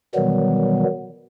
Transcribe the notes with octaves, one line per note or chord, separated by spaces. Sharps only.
B2 D#3 E3 F#3 G3 B3